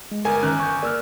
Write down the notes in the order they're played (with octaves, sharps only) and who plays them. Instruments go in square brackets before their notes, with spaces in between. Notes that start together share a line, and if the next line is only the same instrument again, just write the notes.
[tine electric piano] G#3
[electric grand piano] G1 G#5 [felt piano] A#4
[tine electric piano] D#3 C#4 [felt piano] A#5 F6 F#6
[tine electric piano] C#6 G6
[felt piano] A#3 [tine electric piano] D5 E6 F6